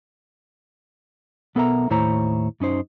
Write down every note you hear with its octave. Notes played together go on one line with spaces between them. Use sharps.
B1 B3 A4 A#4 E5 A#5
D#2 A2 E4 C5 C#5 A#5
F#2 C#4 D#4 C5